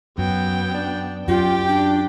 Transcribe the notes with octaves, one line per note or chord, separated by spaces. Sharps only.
F#2 F#3 B3 G5
D4
F#2 F4 G4 D5 G5
D4